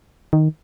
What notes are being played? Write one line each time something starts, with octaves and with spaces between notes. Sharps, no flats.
D#3